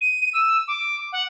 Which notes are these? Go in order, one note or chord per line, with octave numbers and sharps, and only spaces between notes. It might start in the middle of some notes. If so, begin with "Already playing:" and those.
D#7
E6
D6
F#5